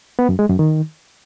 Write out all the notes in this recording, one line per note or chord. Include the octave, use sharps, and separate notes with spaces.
B3
F#2
G#3
F#2
D#3